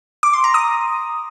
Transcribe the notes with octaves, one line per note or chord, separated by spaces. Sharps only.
D6
C6
A#5
D#6